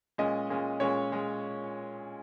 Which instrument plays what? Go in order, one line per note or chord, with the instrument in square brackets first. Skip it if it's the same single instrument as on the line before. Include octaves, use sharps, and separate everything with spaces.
[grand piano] A#2 G#3 C#4 D#5
A#2 G#3 C#4
A#2 G#3 C#4 C#5
A#2 G#3